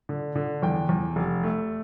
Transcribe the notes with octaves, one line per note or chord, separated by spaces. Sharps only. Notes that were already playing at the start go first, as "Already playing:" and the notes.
D3
D3
E2 G5
E2
F1
A3